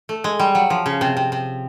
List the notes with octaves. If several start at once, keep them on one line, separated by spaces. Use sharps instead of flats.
A3
G#3
G3
F#3
F3
C#3
C3
C3
C3